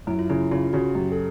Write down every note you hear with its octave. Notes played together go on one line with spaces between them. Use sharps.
F#2 E4
F4
C#3 E4
C#3 F4
C#3 F#4
F#2 G4
A4